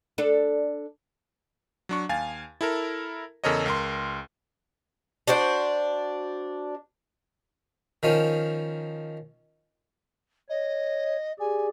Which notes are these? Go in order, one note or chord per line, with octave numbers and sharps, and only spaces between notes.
D4 A4
F#3 D4 C#6
D#2 F5 G#5 A6
E4 A4 A#4
E2 C#3 A4 A#4 C#5 D#5
C#2 A#4 C6
D4 F#4 C5 D5
D#3 F3 C#4
C#5 D#5
G4 G#4 D5 G#5